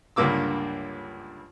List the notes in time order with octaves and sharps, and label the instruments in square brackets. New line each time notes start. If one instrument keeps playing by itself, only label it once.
[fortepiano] C#2 G2 D3 A#3 D6 E6